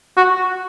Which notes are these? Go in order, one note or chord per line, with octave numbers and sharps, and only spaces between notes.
F#4